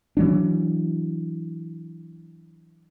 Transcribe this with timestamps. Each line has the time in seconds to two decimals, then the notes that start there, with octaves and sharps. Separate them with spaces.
0.17 E3 F#3 D4